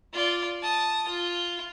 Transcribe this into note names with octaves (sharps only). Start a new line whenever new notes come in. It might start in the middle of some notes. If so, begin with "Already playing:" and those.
F4 D5
A5 D#6
F4